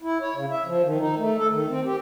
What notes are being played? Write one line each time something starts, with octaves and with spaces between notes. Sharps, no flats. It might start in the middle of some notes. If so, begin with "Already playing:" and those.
E4
C#5
C#3
E5
F3
D#3
D#4
A3
A4
D#3
C4
G4